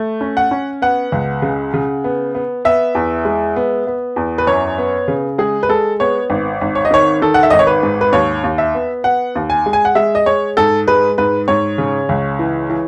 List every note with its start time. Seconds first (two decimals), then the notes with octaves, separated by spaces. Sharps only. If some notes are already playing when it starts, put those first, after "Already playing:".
Already playing: A3
0.21 C#4
0.37 F#5
0.51 C#4
0.82 B3 F#5
1.12 C#2
1.42 C#3
1.74 C#3
2.04 B3
2.35 B3
2.65 B3 E5
2.95 E2
3.25 G#3
3.56 B3
3.87 B3
4.16 E2
4.38 B4
4.47 F#2 C#5
4.78 B3
5.08 C#3
5.38 G#3 G#4
5.63 B4
5.69 G#3 A4
6.00 B3 C#5
6.30 G#1
6.61 G#1
6.75 C#5
6.85 D#5
6.91 D#3 C#5
7.22 D#3 A4
7.34 F#5
7.43 E5
7.50 G#1 D#5
7.59 C#5
7.67 B4
7.83 G#2
8.01 B4
8.13 D#2 C#5
8.44 D#2
8.58 E5
8.75 B3
9.04 B3 F#5
9.35 D#2
9.50 G#5
9.66 G#3
9.73 G#5
9.85 F#5
9.95 G#3 E5
10.15 D#5
10.26 G#3 C#5
10.57 G#2 A4
10.87 G#3 B4
11.18 G#2 B4
11.48 G#2 C#5
11.78 C#3
12.09 C#2
12.39 E3
12.70 E3